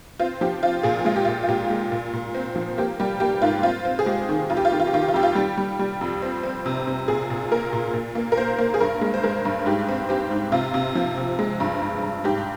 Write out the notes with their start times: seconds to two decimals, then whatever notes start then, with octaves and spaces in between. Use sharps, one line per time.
0.20 C4 F4
0.41 F3 G4
0.63 C4 F4
0.83 A#2 G#4
1.05 G#3 F4
1.16 G4
1.25 F4
1.28 A#2
1.43 F4
1.49 A#2 G4
1.70 G#3
1.92 A#2
2.13 A#2
2.34 C4
2.56 F3
2.78 A#3 G4
3.00 G3 G4
3.20 A#3 G4
3.42 G#2 F4
3.63 C4 F4
3.85 C4
3.99 G#4
4.06 G#3 G4
4.29 D#3
4.50 F2 F4
4.57 G4
4.65 F4
4.72 D#3 G4
4.80 F4
4.87 G4
4.93 D#3 F4
5.02 G4
5.08 F4
5.14 F2 G4
5.23 F4
5.35 G3 G4
5.58 G3
5.79 G3
6.01 F2
6.22 C4
6.43 C4
6.66 C3
6.87 C3
7.08 A#2 G#4
7.30 A#2
7.51 A#3 A#4
7.73 A#2
7.94 A#2
8.15 A#3
8.32 A#4
8.37 A#3 C5
8.58 A#3
8.74 G#4
8.80 G2 A#4
9.01 G#3
9.14 C5
9.23 G#3 A#4
9.45 G2
9.66 G#2 G4
9.89 C4
10.09 C4 G4
10.31 G#2
10.52 C3 F4
10.74 C3
10.95 F3
11.17 C3
11.39 G#3
11.60 G2
11.82 G2
12.03 G2
12.24 G#2 G4